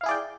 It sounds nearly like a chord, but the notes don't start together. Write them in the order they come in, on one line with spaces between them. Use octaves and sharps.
F5 E4 G#4 D5 G5